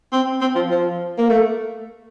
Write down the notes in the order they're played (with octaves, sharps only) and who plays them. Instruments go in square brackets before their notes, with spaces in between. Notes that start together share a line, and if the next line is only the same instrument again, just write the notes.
[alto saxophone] C4
C4
F3
F3
A#3
A3